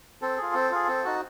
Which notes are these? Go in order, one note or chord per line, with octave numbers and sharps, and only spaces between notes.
C4 A4
F4 G#4
C4
F4 G#4
C4
D#4 F#4